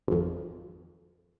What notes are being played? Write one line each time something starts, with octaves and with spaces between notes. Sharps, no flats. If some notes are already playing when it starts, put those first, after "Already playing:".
G#1 F2